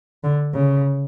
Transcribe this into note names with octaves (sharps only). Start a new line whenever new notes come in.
D3
C#3